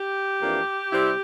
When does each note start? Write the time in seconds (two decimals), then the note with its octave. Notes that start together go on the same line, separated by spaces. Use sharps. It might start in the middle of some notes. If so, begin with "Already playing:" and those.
Already playing: G4
0.42 F2 E3 A#3 D4
0.93 C3 G3 C4 E4